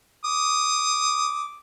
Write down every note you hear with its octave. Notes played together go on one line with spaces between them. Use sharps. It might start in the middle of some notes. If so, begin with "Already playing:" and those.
D6 D#6